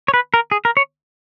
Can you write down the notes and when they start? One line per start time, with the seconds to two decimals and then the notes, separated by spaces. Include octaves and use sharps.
0.08 C#5
0.14 B4
0.34 A#4
0.51 G#4
0.65 A#4
0.77 C#5